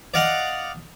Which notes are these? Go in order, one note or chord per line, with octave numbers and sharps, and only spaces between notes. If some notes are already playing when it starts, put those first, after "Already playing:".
D5 D#5 F5 F#5